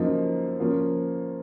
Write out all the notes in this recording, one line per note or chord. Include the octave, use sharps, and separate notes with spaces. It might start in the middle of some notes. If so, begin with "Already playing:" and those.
Already playing: F#2 F3 A#3 D#4
F3 A#3 C#4